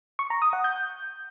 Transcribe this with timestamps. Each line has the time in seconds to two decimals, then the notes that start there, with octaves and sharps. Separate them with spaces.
0.19 C#6
0.30 A#5
0.42 D#6
0.53 F#5
0.64 G6